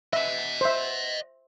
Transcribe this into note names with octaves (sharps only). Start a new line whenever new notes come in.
D#5 E5 F#5
C5 E5